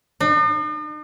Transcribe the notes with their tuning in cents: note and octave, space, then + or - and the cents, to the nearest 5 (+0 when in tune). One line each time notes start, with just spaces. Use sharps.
D#4 -45